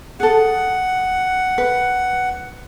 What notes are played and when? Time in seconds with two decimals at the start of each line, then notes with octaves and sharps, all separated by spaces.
0.20 G#4 A4 F#5
1.58 B4